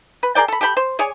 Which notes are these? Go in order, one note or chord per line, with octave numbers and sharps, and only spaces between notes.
B4
G#4 A#4 D5 G5
A4 B5
G4 A4 G5 B5
C5
G#4 C#5 D5 G#5